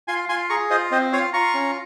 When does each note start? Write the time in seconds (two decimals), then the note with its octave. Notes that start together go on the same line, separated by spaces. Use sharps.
0.08 F4 G#5 C6
0.29 F4 G#5 C6
0.49 G#4 A#5 C#6
0.70 F4 C5 D#5
0.91 C4 C5 D#5
1.13 F4 C#5 F5
1.33 F4 A#5 C#6
1.54 C#4